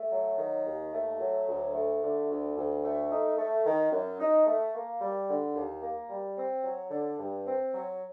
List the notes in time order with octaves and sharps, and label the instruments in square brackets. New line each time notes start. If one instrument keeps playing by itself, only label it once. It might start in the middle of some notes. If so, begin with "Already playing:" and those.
Already playing: [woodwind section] A3
F#3
D#3
D#2
A3
F#3
D2
A3
D3
D2
D2
A3
D#4
A3
D#3
F#2
D#4
A3
A#3
G3
D3
D#2
A#3
G3
C4
F#3
D3
G2
C4
F#3